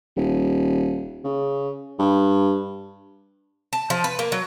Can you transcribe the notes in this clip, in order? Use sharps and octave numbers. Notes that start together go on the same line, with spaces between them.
D#1
C#3
G2
A5
F3
B4
A#3
F#3